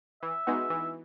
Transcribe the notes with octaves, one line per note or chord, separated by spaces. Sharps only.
E3 E5
G#3 B3 D#4 F#4
E3